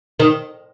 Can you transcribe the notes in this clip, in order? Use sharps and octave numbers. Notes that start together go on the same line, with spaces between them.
D#3